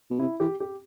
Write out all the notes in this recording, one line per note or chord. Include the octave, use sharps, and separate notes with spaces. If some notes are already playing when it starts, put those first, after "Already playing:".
B2
C3 E4
E3 G4
G4